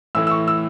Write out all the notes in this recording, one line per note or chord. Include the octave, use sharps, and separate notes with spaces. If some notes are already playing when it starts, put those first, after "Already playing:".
A2 E3 A3 E4 E6
E6
C#6
E6